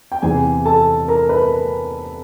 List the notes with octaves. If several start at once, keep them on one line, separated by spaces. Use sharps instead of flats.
G5
E2 C3 E3 G#4 G#5
A4 A5
A#4 A#5
B4 B5